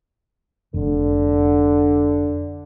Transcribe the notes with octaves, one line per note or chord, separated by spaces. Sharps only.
F1 D3